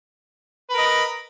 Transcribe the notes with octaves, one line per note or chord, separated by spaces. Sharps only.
A#4 B4 D#5